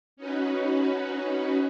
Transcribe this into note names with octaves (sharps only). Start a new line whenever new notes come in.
C#4 D#4 F#4 B4